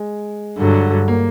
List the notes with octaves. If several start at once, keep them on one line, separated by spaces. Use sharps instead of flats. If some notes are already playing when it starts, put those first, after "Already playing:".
Already playing: G#3
G2 D3 F#3
A#3